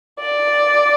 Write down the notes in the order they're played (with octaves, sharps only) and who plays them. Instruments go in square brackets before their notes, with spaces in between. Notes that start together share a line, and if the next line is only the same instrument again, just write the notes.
[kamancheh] D5